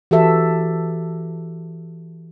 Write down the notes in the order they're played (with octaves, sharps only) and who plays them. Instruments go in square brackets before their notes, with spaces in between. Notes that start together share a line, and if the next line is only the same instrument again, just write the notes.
[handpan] E3 F#4 G4 A4 E5